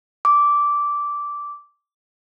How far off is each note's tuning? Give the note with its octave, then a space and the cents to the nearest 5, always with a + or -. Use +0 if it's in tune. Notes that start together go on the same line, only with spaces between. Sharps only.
D6 -10